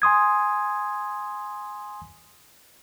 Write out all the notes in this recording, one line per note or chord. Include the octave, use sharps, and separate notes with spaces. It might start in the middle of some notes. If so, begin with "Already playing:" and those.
G#5 C6 D#6 G#6